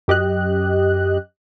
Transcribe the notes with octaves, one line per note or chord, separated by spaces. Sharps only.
F#2 G4 D#5 F#6